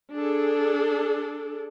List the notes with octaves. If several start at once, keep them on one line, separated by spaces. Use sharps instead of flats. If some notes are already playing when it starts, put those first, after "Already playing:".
D4 G#4 A4